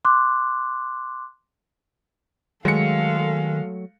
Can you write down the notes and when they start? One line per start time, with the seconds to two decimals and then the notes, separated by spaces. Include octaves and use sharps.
0.05 C6 D6 F#6
2.65 D#3 F#3 G#3 A3 A4 F5 C#7